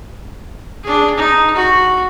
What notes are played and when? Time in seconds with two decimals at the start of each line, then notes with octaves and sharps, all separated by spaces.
0.83 D4 G#4
1.17 D#4
1.56 F#4